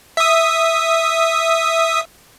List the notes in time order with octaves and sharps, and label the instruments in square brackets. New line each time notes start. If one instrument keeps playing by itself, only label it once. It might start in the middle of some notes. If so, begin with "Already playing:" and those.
[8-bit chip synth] E5 D#6